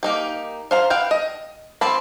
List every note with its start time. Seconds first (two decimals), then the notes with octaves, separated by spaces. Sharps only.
0.03 A#3 D#4 G4
0.71 C5 F5 A#5
0.90 B3 F5 G5
1.11 D#5
1.81 F3 C4 C5 A5 B5